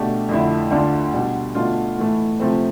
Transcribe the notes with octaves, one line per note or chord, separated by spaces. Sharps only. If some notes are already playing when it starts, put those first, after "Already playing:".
Already playing: B2 A3 D4 G4
F2 D3 A3 E4
D2 D3 A3 D4 F4
B2 G3 D4
B2 A3 D4 F4
A2 E3 A3
C3 F3 A3 C4